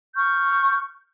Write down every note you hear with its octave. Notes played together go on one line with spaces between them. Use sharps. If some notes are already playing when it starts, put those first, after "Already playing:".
C#6 F6 G6